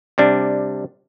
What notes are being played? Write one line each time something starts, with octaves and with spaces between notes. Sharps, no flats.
C3 G3 D4